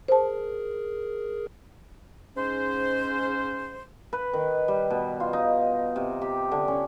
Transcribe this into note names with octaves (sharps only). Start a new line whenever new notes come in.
G#4 A#4 C5 A5
G#2 C#4 C5
B4
D#3
G3
B2
F4
D#4
C3
G4
D3
C#4